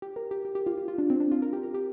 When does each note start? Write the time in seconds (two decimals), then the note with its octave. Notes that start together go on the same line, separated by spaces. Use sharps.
0.02 G4
0.16 A#4
0.31 G4
0.45 G4
0.55 G4
0.66 F4
0.78 F4
0.88 F4
0.98 D4
1.10 C4
1.20 D4
1.32 F4
1.42 A#4
1.53 G4
1.63 A#4
1.74 G4